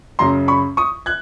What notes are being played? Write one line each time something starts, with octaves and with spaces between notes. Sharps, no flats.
F#2 C#3 F#3 A#5 C6
B5 C#6
C#6 D#6
F#6 G#6